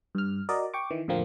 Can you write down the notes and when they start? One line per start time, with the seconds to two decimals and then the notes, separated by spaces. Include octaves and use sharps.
0.15 G2 F6
0.49 F#4 A#4 D5 D#5
0.74 G5 C#6 D6
0.91 D#3 E3
1.08 F2 A2 D3 F3 A#3 C4